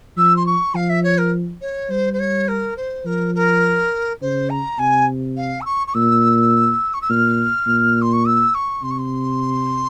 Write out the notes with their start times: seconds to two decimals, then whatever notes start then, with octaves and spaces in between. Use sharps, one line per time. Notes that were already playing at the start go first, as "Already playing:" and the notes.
0.17 F3 E6
0.36 C6
0.46 C#6
0.75 F3 F5
0.89 E5
1.03 C#5
1.18 A#4
1.61 C#5
1.90 G3 C5
2.13 C5
2.19 C#5
2.48 A#4
2.76 C5
3.05 F3 A#4
3.34 A#4
4.21 C#3 C5
4.49 A#5
4.78 C3 G#5
5.36 F5
5.61 E6
5.65 C#6
5.87 C#6
5.94 A#2 E6
6.93 C#6
7.01 E6
7.10 A#2 F6
7.67 A#2
8.01 C6
8.13 C#6
8.25 E6
8.54 C#6
8.83 C3 C6
8.90 C#6
8.98 C6